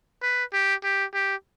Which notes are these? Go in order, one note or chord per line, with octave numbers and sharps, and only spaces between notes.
B4
G4
G4
G4